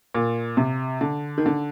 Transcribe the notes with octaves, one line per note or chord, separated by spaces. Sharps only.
A#2
C3
D3
D#3
D3